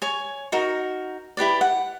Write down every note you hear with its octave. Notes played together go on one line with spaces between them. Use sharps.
C#5 G#5
D#4 F#4 A#4
E4 G4 B4 D5
F#5